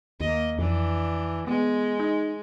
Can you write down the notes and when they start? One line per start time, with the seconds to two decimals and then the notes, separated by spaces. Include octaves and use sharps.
0.20 D#2 A#3 D#5
0.59 F2 E3 D4
1.47 G#3 B3
2.00 D#4